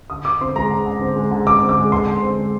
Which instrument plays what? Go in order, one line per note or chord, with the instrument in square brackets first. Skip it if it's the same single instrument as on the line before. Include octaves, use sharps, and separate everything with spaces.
[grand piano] D3 D#6
D3 D6
C4 C6
G#3 A#5
D3
D3
C4
G#3
D3
D3 D6
C4
D6
G#3
D3 C6
D3
C4
G#3